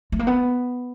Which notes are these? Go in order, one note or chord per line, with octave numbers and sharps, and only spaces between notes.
A3
A#3
B3